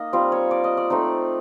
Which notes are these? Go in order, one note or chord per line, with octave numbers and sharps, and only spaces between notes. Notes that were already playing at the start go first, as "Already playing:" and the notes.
Already playing: A#3 D#4 D#5
G3 C4 F4 F5
C#5
D5
D#5
D5
A3 C4 D#4